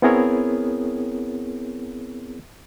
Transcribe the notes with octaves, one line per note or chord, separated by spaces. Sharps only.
B3 C4 E4 G#4 A#4 C#5